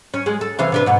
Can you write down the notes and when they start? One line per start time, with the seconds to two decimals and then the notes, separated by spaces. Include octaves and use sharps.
0.14 C#4
0.26 G#3
0.41 A4
0.59 C3 E3 F5
0.72 C3 D4 B4
0.86 G#2 B2